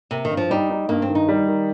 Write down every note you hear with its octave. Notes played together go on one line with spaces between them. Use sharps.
C3 A#3
D#3
G2
F3
G3 D#4
D#4
G2 A#3
C4
D#3
D#4
G3
D#3